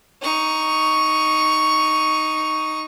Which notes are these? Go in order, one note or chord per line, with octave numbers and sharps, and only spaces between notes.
D#4 C#6